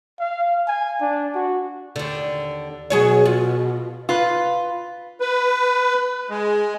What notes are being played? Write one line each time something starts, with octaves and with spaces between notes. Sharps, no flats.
F5
G#5
D4
F#4
D#2 D3
B2 F#3 G#4 C#5
F4
F4 B4
B4
G#3